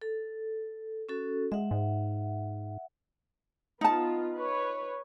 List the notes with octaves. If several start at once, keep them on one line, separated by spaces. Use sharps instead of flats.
A4
C#4 F#4 A4
G#3 E5 F#5
G#2
B3 D#4 F4 A5
B4 C#5